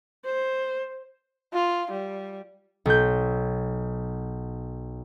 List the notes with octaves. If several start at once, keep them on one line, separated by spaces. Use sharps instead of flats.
C5
F4
G3
B1 G6